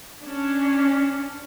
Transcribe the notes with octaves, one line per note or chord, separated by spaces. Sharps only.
C#4 D4